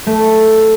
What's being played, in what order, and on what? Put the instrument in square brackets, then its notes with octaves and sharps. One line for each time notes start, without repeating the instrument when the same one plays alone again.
[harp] A3